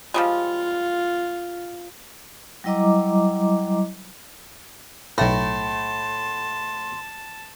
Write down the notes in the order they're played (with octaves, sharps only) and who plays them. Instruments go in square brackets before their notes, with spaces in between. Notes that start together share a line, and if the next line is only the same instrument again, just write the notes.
[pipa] F3 G3 G#3 [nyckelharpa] F4
[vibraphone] F#3 G3 E4 D#5 A#5 D6
[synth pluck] B1 A#6 [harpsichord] A2 [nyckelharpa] A5 [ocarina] C6